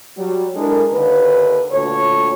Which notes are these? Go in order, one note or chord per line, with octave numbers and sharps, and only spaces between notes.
F#3 G3
G#3 D4 E4 A4 A#4
D#2 D3 B4
D2 A#2 D3 A4 C#5